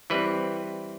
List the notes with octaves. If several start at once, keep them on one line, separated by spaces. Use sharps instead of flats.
E3 G3 C4 B4